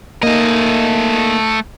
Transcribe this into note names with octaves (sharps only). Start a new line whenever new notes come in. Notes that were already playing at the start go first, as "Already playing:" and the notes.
A3 A#3 D#4 D#5